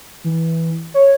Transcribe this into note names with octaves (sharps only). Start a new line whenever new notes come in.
E3
C#5